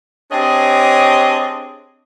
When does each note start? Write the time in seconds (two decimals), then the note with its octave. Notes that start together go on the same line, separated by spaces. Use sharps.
0.32 C4 D4 G4 G#4 C#5 D#5